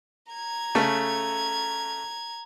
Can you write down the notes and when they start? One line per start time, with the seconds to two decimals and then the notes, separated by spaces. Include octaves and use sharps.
0.32 A#5 G#6
0.75 C#3 A3 A4